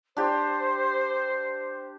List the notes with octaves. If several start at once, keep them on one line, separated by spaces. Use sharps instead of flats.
D4 G4 C5